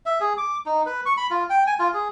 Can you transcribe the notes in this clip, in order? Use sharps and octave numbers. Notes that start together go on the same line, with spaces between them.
E5
G#4
D6
D#4
B4
C#6
B5
F4
G5
G#5
F4
G#4